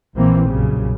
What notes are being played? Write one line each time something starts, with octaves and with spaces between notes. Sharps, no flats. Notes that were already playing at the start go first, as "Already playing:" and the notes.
A#1 A#2 E3 A#3 C4
B1 F#2 A#2 C#3 G3